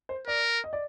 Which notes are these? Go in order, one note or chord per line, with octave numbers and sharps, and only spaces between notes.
C5
A#4 D5
D#5
D5